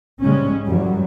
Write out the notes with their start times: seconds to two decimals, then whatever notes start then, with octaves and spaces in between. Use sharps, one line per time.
0.22 G#2 C#3 G3 G#3 C#4
0.69 F#2 E3 F#3 G3